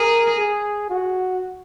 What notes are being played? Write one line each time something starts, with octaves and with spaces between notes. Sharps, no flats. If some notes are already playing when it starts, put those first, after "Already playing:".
Already playing: G#4 A#4
G#4
F#4